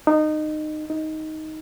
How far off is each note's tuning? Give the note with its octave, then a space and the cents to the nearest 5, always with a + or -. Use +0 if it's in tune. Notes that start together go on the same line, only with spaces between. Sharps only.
D#4 -20
D#4 +10